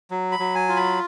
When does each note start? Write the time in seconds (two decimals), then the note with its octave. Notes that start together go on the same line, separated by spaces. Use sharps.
0.11 F#3
0.32 B5
0.39 F#3
0.55 G#5
0.69 F4
0.76 B5